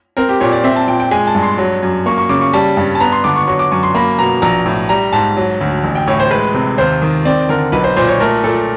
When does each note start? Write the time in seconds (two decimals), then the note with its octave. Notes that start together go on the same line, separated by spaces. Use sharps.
0.17 C4 A#4
0.29 G4
0.40 A#2 C#5
0.52 D5
0.64 C4 E5
0.76 A5
0.87 A#2 G5
1.00 G5
1.11 G#3 G#5
1.27 A5
1.35 G2
1.43 C6
1.58 F#3
1.83 F#2
2.06 A#3 C#6
2.18 C#6
2.29 C#3 D6
2.41 C#6
2.53 G3 A5
2.77 G2
2.95 A5
3.00 B3 A#5
3.12 C6
3.24 D3 D6
3.36 C#6
3.47 F#3 C#6
3.59 D6
3.71 F#2 C#6
3.83 C6
3.95 A#3 B5
4.18 B2 A#5
4.42 A#1 A#5
4.65 A2
4.89 G3 A#5
5.12 G#2 A5
5.37 F#3
5.61 D2
5.84 A1
5.95 G5
6.07 A2 C#5
6.20 C5
6.31 G#3 B4
6.54 C3
6.78 D#2 C5
7.02 D#3
7.25 C4 D5
7.49 D3 A#4
7.72 B1 B4
7.84 C5
7.96 A#2 C5
8.08 C#5
8.20 A3 A#4
8.44 A#2 A4